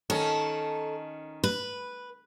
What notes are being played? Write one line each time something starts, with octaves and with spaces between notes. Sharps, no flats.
D#3 C#4 A4
B4